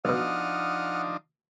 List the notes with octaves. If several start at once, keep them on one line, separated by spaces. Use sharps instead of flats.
B1 B2 F3 D4 D#4 F#5 D#6 F6